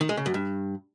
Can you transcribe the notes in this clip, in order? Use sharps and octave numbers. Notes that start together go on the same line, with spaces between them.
D#3
G#3
C#3
F#2
G2